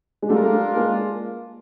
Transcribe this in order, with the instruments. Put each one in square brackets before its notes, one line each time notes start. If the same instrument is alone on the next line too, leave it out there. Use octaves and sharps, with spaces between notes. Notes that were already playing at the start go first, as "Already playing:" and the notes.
[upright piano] G#3
[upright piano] G3 A3 [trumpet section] D4 F4 A#4
[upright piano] G#3 A#3